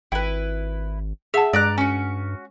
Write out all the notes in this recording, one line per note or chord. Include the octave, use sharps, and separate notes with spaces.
G#1 E4 B4 G5
G#4 E5 F#5 A5
G2 G#3 D5 A#5 F#6
C#4 F#4 G#5